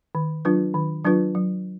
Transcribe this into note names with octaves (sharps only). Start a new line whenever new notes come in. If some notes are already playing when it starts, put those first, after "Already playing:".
D#3
F#3 D4 F4 B4
D#3
F#3 D4 F4 B4
F#3